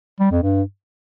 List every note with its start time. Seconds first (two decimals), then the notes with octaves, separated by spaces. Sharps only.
0.20 G3
0.31 F2
0.43 G2